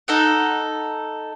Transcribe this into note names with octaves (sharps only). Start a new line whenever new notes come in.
D#4 A4 F#5